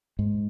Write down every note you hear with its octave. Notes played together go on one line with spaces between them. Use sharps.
G#2